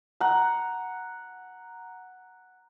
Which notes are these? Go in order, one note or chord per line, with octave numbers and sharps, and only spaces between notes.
F#5 A#5